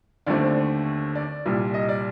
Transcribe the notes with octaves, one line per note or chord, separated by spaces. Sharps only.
D#2 D3 A3 C4 D5
C5
C5
D5
C2 A#2 G3
D#5
D5